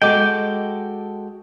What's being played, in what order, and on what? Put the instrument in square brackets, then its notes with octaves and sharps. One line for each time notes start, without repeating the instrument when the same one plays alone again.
[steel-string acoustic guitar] G#3 F#4 A4 [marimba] D#5 [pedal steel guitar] G5 D6